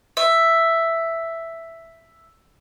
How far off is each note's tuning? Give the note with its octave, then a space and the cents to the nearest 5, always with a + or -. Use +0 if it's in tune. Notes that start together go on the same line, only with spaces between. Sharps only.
E5 +5